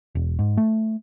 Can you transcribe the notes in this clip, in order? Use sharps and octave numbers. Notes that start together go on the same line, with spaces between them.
E1
G#2
A3